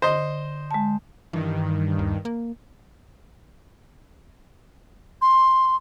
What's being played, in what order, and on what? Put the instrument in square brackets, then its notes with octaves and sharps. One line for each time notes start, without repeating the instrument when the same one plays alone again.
[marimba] D3 [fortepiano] C5 D#5
[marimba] G#3 A5
[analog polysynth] G2 D#3 [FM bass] E3
[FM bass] D#2
A#3
[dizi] C6